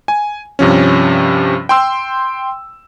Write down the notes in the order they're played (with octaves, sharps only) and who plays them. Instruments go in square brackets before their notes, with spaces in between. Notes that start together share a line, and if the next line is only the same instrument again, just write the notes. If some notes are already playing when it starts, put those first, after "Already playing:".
[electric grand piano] G#5
G2 C3 F3 C#4
G5 C6 E6